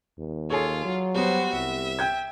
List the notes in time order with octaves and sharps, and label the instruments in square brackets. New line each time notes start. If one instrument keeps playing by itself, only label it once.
[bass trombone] D#2
[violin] F4 [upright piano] G#4 A4 C#5
[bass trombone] F#3
[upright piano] G3 B3 [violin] F#4 C5
[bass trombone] C2 [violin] E5
[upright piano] G5 G6 G#6